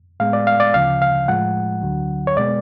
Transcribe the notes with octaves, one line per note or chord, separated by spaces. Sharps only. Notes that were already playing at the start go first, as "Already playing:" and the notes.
A2 G#3 B3 F5
D5
F5
D5
D2 C#3 F3 F5
F5
A2 F3 G#3 F#5
D2 D3 F#3
C#5
B2 G#3 B3 D5